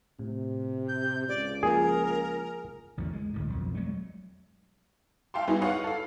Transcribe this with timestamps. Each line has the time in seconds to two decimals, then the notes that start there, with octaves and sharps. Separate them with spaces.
0.19 A2 C3
0.89 G6
1.28 C#2 D5
1.63 F3 A#3 F4 G#4 A#4
2.98 A1 E2 D3 F#3
3.13 G#3
3.33 G#1 D2 A2
3.50 B1 F2
3.75 F#3 G#3 A3
5.34 E5 F5 G5 A5 C6
5.47 G3 B3 D#4 E4 F#4 G#4
5.62 B4 C#5 F5 F#5
5.84 A4 F5